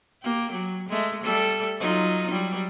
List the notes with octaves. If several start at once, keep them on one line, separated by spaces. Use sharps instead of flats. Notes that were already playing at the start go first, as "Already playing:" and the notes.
A#3 G4
F#3
G#3 A3
G3 A3 A4
F#3 D#4 F4
F#3 G3